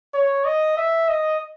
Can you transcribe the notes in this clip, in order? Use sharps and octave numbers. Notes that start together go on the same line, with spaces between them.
C#5
D#5
E5
D#5